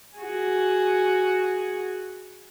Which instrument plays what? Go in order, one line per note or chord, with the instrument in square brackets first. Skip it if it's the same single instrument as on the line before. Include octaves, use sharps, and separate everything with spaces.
[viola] F#4 G#4